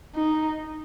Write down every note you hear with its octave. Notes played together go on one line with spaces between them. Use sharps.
D#4